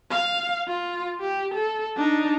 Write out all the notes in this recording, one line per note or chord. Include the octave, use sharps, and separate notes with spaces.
F5
F4
G4
A4
D4 D#4